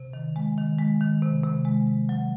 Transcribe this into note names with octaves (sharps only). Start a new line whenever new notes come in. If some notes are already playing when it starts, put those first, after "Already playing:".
Already playing: C3
D#3
G#3
D#3
G#3
D#3
C3
C3
G#3
G#3
F#3